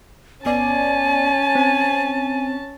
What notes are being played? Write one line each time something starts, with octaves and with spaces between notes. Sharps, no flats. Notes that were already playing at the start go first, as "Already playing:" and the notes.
G1 B3 C#4 D5 G#5 A5
C4